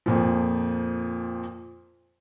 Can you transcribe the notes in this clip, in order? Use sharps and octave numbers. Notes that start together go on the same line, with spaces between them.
F2 A#2 F3